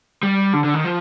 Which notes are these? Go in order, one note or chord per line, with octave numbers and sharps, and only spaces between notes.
G3
D3
D3
D#3
F3